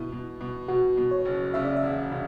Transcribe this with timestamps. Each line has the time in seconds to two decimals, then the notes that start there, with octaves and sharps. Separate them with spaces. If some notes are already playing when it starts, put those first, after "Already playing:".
Already playing: B2 E4
0.12 B2
0.41 B2
0.68 B2 F#4
0.97 B2
1.11 C#5
1.25 F#1
1.54 C#3 E5
1.65 D5
1.76 E5
1.83 E1
2.12 C#3